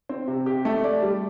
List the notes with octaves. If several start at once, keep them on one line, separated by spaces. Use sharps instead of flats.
C4
C3
G4
A3
D5
G3